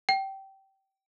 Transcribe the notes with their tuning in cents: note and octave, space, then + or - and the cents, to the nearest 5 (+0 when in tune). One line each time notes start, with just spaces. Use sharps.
G5 -20